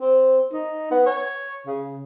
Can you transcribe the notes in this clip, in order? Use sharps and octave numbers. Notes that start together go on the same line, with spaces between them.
C4
D#4
B3
C#5
C#3